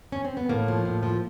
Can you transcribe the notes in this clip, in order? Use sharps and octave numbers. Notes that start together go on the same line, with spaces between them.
C#4
C4
B3
A2 A#3
F3
A2
F3